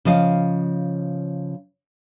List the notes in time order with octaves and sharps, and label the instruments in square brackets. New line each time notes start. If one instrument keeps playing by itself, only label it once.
[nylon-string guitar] C#3 F3 D#5 F5